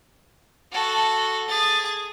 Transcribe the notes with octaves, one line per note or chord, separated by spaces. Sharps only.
F#4 A4
G#4 A6